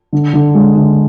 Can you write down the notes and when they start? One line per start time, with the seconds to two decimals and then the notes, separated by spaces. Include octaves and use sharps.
0.13 D3
0.34 D3
0.55 G#3
0.76 D3